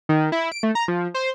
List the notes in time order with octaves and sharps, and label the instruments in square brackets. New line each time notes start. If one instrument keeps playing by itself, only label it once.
[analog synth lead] D#3
E4
D7
A3
A#5
F3
C5